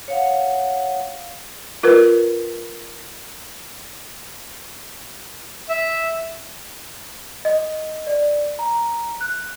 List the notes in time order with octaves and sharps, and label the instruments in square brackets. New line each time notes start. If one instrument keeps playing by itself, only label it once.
[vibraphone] C#5 F5 F#5
[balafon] F4 A#4 B4
[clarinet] E5
[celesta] D#5
D5
A#5
F#6